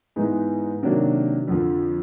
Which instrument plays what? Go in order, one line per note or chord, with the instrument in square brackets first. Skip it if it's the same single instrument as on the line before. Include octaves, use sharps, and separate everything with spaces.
[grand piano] G#2 E3 G#3 B3 D#4
C3 D#3 F#3 A#3 D4
F2 D3 F3